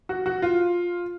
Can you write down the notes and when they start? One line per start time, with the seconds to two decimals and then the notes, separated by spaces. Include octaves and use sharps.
0.09 F#4
0.26 F#4
0.42 F4